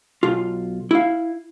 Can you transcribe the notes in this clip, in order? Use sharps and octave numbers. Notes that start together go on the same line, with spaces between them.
B1 F4
E4 F5